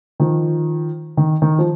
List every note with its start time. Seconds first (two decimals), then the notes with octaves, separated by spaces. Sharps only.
0.20 D#3 F3
1.17 D#3
1.42 D#3
1.59 F3